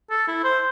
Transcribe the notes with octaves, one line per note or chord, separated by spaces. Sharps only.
A4
E4
C5